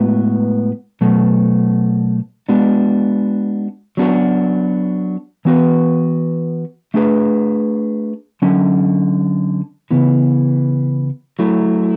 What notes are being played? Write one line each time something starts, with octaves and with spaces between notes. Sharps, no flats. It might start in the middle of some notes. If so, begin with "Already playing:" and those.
Already playing: A2 G#3 B3 F#4 B4
B2 F#3 A3
G#3 B3 D4 F#4
F#3 B3 D4 F#4
E3 B3 F#4 B4
A3 D4 G#4 B4
D3 F#3 C#4
C#3 E3 B3
F#3 A3 E4